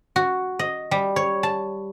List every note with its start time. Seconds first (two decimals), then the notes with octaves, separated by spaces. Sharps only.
0.16 F#4
0.59 D#5
0.91 G3
1.16 C#5
1.43 A5